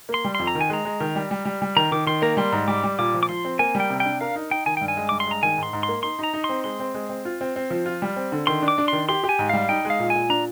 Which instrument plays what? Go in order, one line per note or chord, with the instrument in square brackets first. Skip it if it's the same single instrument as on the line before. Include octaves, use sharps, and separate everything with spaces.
[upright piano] A#3
[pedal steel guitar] C6
[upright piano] G3
[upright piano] F2 [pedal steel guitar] C6
[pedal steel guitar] A#5
[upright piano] D#3
[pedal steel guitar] G#5
[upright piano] G#3 [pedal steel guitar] A#5
[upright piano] G#3
D#3
G3
G3
G3
G3
[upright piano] D#3 [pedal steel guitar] A#5
[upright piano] D#3 [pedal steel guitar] D6
[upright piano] D#3 [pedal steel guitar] C6
[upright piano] A#3 [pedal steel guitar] A#5
[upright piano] G3 [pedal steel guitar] C6
[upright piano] G#2
[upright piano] G3 [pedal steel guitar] D6
[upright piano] G3
[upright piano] A#2 [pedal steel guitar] D6
[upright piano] F3
[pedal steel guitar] D6
[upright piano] F3 [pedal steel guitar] C6
[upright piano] C4
[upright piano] A#3 [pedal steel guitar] G#5
[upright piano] G3
[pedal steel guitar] G5
[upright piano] C3
[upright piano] D4 [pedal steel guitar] G5
[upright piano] A#4 [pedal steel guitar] F5
[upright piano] D#4
[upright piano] D#4 [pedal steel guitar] G5
[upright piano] D#3 [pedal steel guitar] G#5
[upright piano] G2 [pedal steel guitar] G5
[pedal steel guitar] G#5
[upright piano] G#3
[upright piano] G2 [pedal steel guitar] D6
[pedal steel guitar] C6
[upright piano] G#3 [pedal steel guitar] A#5
[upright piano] D#3 [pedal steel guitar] G#5
[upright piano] G#2 [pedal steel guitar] C6
[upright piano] G#2
[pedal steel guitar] C6
[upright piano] A#3
[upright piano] D#4 [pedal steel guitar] C6
[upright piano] D#4 [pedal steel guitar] A#5
[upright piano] D#4
[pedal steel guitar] C6
[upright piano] C4
[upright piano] G#3 [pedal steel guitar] C6
[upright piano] C4
G#3
C4
F4
C4
C4
F3
F4
G3
C4
D3
[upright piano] D#3 [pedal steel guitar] C6
[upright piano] D4
[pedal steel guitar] D6
[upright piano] D4
[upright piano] D#3 [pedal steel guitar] C6
[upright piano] G4 [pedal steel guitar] C6
[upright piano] G4
[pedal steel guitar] G#5
[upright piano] G#2
[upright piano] G3 [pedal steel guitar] F5
[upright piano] D#4 [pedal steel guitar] G5
[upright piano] G#3
[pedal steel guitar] F5
[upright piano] A#2
[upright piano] A#2 [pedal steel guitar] G#5
[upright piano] D4 [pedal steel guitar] A#5